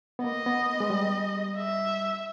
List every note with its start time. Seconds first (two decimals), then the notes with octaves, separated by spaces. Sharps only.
0.19 B3
0.24 A#3 D#5
0.46 B3
0.80 G#3
0.90 G3
1.57 E5